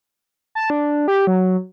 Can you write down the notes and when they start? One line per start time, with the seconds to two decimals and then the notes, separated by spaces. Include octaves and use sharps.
0.55 A5
0.70 D4
1.08 G4
1.27 F#3